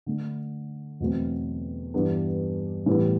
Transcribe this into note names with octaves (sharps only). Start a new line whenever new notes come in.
D3 A3 D4
E2 B2 F#3 A3 C4
G2 E3 G3 B3 D4
A2 E3 G3 B3